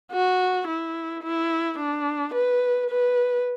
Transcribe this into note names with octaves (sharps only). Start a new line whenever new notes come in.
F#4
E4
E4
D4
B4
B4